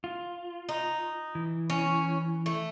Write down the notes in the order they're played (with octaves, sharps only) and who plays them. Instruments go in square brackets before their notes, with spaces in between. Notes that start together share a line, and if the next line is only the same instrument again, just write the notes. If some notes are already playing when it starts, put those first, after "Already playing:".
[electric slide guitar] F4
[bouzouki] D#4
[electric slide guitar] E3
[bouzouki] C#4
A3